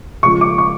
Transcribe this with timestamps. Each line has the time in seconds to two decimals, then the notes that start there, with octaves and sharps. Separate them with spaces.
0.23 C#3 F3 G#3 C#6
0.41 D6
0.58 C#6